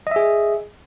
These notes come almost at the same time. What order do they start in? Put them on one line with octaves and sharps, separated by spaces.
D#5 E5 G#4